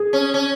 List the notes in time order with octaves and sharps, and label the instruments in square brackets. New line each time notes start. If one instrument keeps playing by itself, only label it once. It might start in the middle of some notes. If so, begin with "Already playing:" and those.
Already playing: [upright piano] G#4
[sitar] C#4
C#4